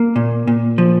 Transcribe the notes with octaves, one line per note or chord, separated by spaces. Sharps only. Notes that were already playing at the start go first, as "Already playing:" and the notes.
Already playing: A#3
A#2
A#2
F3